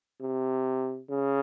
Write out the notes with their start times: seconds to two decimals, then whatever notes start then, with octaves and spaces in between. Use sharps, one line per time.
0.21 C3
1.10 C#3